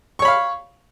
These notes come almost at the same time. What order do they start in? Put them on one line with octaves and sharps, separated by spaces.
C#6 C#5 B5 F5